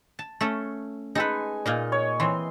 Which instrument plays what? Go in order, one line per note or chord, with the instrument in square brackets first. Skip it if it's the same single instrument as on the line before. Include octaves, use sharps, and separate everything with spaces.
[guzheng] A5
A3 C#4 A4
[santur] G#3 G#5 [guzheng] D#4 A4 B4
[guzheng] A#2 A#3 D#4 [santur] D#5
[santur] C#5
[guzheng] E3 C4 [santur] C6